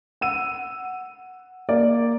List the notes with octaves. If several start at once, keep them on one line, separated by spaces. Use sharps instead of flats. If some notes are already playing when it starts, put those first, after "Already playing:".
F#5 E6 D#7
A#3 D5